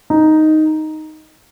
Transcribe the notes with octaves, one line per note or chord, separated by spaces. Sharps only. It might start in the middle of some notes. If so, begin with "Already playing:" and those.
D#4